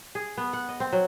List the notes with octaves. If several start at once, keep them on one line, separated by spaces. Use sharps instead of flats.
G#4
B3
F#5
D#5
C4
F#3